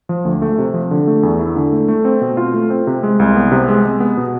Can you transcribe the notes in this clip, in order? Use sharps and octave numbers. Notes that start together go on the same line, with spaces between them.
F3
D2
A3
C3
F3
D3
A3
E2
E4
D3
A3
A3
C4
B2
F4
A3
C4
C3
G#3
C2
B3
C3
G#3
G#3
B3
B2